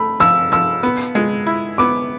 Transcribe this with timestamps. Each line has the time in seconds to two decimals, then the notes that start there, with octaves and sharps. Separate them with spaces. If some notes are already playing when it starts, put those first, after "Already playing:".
Already playing: A3 B5
0.20 F3 E6
0.52 F3 E6
0.83 B3
1.15 G#3
1.47 E4
1.78 B3 D6